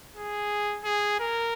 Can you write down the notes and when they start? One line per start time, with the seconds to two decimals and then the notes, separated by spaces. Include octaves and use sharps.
0.17 G#4
0.85 G#4
1.20 A#4